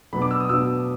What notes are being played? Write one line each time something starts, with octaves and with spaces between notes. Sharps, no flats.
B2 F#3 B3 D4 B5
D6
E6
D#6
B2 F#3 B3 D4 E6